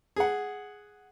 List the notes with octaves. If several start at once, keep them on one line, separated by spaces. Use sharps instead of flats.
G#4 F#5